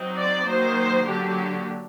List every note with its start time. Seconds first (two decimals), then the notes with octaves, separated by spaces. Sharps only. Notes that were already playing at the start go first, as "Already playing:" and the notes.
Already playing: F#3 C4 D#4
0.18 D5
0.47 D#3 F#3 A#3 D#4 C5
1.06 D3 F#3 A#3 D4 G4